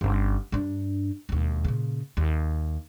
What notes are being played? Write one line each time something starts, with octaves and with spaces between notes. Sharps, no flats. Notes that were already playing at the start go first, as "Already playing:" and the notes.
G1 C#4
G2 D4
E1 D#2
A#2 C#3
D#2